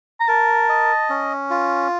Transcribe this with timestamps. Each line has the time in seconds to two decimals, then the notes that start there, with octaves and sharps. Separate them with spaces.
0.20 A#5
0.28 A#4 A5
0.69 D#5
1.10 C#4
1.50 F4